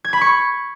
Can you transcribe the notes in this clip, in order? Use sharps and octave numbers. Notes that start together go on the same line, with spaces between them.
G#6
B5
C#6